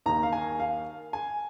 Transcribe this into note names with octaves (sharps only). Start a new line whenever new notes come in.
D#2 D#3 A#3 D#4 A#5
F5
G#5
F5
G#5